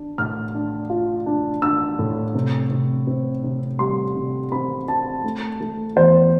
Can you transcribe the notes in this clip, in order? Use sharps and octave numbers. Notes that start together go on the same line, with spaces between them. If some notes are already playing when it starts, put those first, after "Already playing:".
Already playing: D4
A2 F6
D4
F4
D4
D4 E6
A2
C3
C3
C4
C3
G3 C6
C3
C4 B5
C4 A5
A3
A3
E2 C5